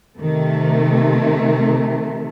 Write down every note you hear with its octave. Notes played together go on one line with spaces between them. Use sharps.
C3 D#3 A3